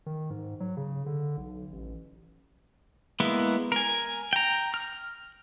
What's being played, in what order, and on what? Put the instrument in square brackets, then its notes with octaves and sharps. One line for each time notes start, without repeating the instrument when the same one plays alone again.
[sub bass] D#3
G#2
F#3
C#3
D3
B1
A1
[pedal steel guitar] G#3 A#3 B3 E4
A#4 G#5
G5 A#5
F6